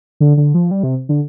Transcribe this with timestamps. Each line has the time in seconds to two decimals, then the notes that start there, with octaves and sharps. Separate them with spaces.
0.20 D3
0.37 D3
0.54 F3
0.71 G3
0.83 C3
1.09 D3